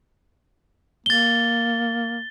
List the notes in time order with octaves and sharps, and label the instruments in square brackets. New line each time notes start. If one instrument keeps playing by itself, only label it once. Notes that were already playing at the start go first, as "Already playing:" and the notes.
[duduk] A#3 [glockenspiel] A6 G7